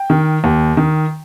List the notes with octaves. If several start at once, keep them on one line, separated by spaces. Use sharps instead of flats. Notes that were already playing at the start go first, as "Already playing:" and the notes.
Already playing: G5
D#3
D#2
D#3